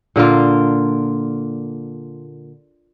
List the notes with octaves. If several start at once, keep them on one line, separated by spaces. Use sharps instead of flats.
A#2 D3 A#3 F4